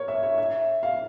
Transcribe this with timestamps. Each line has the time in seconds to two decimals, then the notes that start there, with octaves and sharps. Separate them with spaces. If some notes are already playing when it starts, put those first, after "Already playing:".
Already playing: A#4 C#5
0.08 E5
0.22 C#5
0.38 E5
0.83 F5